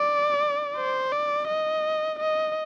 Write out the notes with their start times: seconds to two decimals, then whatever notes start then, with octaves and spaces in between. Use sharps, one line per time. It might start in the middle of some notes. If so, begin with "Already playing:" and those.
Already playing: D5
0.76 C5
1.12 D5
1.48 D#5
2.19 D#5